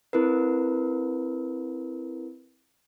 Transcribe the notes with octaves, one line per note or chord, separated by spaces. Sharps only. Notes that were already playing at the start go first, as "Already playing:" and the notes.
C4 E4 A#4 B4